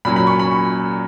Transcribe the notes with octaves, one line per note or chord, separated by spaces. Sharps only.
A#2 F#3 C#4 B5
B5
C#6
B5